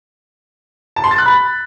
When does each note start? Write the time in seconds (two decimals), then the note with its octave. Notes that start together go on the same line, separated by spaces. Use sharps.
0.96 A5
1.04 C6
1.11 A6
1.18 F#6
1.26 B5